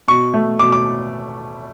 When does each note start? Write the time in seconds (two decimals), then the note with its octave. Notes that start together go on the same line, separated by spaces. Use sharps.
0.08 B2 C#6
0.34 A3
0.59 B2 D6
0.72 D6